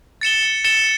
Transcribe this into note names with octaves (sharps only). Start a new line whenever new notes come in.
A6 C#7 E7 G7
A6 C#7 E7 G7